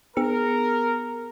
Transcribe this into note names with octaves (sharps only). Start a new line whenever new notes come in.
B3 G#4 A#4 C#7